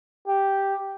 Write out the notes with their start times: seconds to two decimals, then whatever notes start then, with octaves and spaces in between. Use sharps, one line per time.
0.27 G4